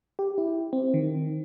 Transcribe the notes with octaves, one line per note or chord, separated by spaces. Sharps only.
G4
E4
C4
D#3